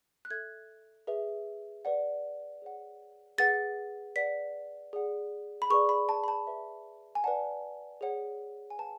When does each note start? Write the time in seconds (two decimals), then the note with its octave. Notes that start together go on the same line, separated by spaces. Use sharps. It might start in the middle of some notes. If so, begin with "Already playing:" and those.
0.25 F#6
0.30 A4 E5 G#6
1.07 G#4 B4 E5
1.85 B4 D5 F#5
2.62 G#4 C#5 F#5
3.38 G#4 B4 F#5 A6
4.16 B4 D5 F#5 B6
4.93 G#4 D5 F#5
5.62 B5
5.70 G#4 B4 D5 C#6
5.89 B5
6.09 A5
6.24 B5
6.28 A5
6.47 B4 E5
7.15 G#5
7.24 B4 D5 F#5 A5
8.01 G#4 C#5 F#5
8.70 G#5
8.78 B4 F#5 A5